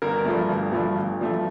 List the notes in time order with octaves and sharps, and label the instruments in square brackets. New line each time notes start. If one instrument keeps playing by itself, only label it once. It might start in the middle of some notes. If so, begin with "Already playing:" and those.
[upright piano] G1 A#4
G2 F3 A3
G1
G2 F3 A3
G1
G2 F3 A3